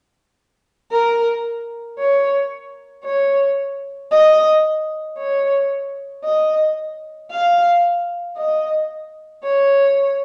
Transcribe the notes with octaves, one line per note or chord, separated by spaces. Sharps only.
A#4
C#5
C#5
D#5
C#5
D#5
F5
D#5
C#5